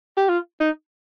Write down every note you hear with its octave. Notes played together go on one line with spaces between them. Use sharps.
G4
F4
D#4